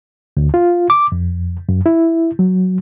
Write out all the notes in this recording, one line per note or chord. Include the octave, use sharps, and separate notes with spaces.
D2
F4
D6
F2
F#2
E4
F#3